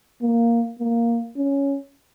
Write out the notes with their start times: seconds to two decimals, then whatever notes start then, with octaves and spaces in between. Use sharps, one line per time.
0.22 A#3
0.79 A#3
1.37 C#4